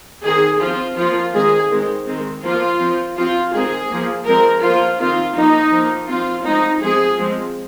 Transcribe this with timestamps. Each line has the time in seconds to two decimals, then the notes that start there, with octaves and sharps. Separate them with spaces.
0.24 D#3 C4 G#4
0.60 F3 C4 F4
0.96 F3 A#3 F4
1.33 D#3 G#3 C4 G#4
1.70 D#3 G#3 C4
2.06 D#3 G#3 C4
2.43 F3 A#3 F4
2.79 F3 C4
3.16 F3 C4 F4
3.52 D#3 G#3 C4 G#4
3.89 F3 A#3
4.26 F3 G#3 C4 A#4
4.63 F3 A#3 F4
4.99 D#3 C4 F4
5.35 F3 A#3 D#4
5.72 F3
5.77 A#3
6.08 F3 C4 F4
6.45 F3 G#3 C4 D#4
6.81 F3 G#3 C4 G#4
7.18 F3 G#3 C4